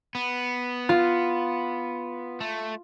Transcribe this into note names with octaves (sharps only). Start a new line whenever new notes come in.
B3
F4
A3